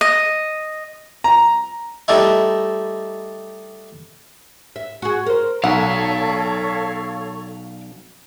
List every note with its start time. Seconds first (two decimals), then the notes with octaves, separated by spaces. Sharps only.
0.01 D#5
1.24 A#5
2.08 G3 A3 D#4 E4
4.76 E5
5.02 F#4 G#4
5.26 A#4 C5
5.64 B1 A4 C#5 D5 F5 F#5 C#6